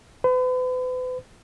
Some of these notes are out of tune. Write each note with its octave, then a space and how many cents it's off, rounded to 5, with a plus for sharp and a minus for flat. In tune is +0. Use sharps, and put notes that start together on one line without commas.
B4 +40